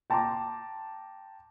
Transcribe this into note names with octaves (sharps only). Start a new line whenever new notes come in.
G5 A5 A#5 C6 D6